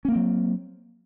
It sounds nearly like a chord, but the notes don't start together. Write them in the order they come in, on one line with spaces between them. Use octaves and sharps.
C#4 A#3 C4 F#3